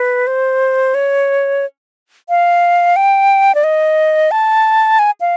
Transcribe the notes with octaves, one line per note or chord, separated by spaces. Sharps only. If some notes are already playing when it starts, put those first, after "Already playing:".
Already playing: B4
C5
C#5
F5
G5
D5
D#5
A5
G#5
F5